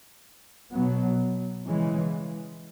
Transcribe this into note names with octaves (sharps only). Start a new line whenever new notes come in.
B2 F#3 B3
C#3 E3 G#3